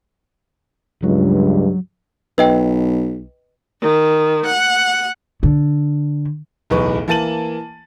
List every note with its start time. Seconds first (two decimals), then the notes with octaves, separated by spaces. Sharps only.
1.03 C#2 G2 F#3
2.38 B1 B4 D#5 G5
3.82 D#3
4.45 F#5
5.43 D3
6.70 D1 B1 E2 B4 C#6
7.08 E3 A#3 A5 A6 D#7 F#7